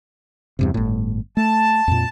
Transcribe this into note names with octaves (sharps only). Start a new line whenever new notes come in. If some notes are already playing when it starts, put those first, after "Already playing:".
E2 G2 C3
G1 A2
A3 A5
F2 A#2